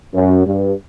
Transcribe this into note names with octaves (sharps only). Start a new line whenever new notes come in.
F#2
G2